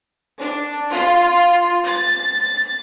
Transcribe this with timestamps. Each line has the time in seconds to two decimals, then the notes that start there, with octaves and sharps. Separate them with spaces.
0.40 D4
0.91 F4
1.86 A6